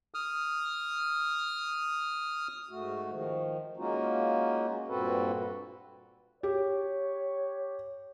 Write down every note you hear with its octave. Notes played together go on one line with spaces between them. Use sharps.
D#6 F6
G#2 A3 F#4
D#3 F3
G#3 A#3 C#4 D#4 F4 F#4
G2 A#2 C4 F#4 A4 B4
G4 C#5